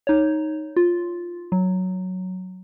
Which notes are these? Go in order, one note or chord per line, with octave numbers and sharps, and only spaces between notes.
D#4 C#5
F4
F#3